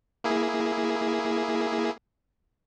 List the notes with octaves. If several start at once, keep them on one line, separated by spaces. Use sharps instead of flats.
A#3 E4 G#4